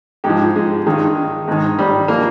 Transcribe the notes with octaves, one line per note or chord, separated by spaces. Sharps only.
G#2 G4
F3
G#3
G2 D#3 G#3
G#2 D#3
G3
F3 A#3